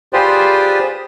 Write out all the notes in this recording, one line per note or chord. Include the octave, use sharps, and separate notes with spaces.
F4 G4 G#4 B4 C5 D5